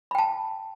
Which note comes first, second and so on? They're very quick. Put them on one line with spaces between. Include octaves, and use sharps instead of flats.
B5 G5 A5